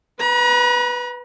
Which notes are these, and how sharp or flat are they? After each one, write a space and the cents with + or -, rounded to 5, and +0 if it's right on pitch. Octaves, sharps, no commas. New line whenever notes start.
B4 +0 A#5 +45